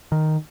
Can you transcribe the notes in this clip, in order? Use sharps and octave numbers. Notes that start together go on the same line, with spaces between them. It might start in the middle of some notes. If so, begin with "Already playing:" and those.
D#3